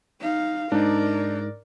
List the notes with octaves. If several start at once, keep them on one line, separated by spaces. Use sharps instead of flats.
D#4 F5
G#2 D4 D#4 A#4 D5